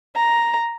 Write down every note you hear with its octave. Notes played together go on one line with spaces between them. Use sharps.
A#5